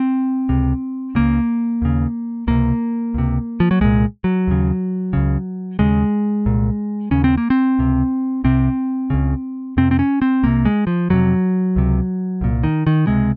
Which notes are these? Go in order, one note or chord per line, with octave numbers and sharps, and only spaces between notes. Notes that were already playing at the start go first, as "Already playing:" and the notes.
Already playing: C4
C#2 C3
C#2 C#3 A#3
D#2 C#3
C#2 C3 A#3
C#2 C3
F3
F#3
C2 A#2 G#3
F#3
D#2 C#3
C#2 C#3
D#2 C#3 G#3
C2 A#2
D#2 C#3 C#4
C4
A#3
C4
C#2 C3
C2 C3 C4
C#2 C#3
F2 C3 C4
C4
C#4
C4
C2 C3 A#3
G#3
F3
F2 C3 F#3
C#2 C3
C2 A#2
D#3
D#3
C#2 C3 G#3